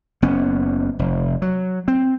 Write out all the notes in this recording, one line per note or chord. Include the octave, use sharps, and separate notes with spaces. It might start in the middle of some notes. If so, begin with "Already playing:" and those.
F#1 B3 C#4
F1
F#3
C4